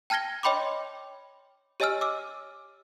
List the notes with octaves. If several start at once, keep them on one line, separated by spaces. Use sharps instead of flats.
G5 A5 F6 G#6 A#6 G7
C#5 D#5 G5 B5 C6 D6
G4 C#5 D#5 G#5 E6 F6
D6 E6